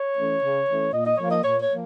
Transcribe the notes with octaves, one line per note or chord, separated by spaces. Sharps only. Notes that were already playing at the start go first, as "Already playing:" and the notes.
Already playing: C#5
E3 A3 C#4
C#3
E3 A3 C#4
A#2 D#5
D#5
F3 A#3 C#5
D#5
A#2 C#5
C#5
F3 A#3